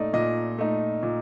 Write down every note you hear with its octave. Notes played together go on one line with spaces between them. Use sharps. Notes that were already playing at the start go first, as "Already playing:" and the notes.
Already playing: A#2 A3 D#4 D5 D#5
A#2 D#5
A3 D#4
A#2